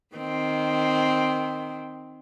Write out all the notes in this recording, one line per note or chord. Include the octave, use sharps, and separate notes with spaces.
D#3 C4